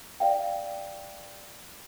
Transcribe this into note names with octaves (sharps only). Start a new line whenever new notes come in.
D5 F5 G5